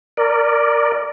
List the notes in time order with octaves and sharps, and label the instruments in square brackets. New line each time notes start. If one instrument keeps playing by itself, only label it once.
[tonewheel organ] A#4 D5